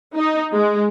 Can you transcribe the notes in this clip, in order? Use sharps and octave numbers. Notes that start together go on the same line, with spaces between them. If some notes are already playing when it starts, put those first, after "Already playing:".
D#4
G#3